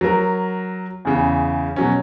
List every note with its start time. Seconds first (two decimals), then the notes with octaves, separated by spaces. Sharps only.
0.01 F#3 A#4
1.05 E2 C#3
1.76 B2 F#3 C#4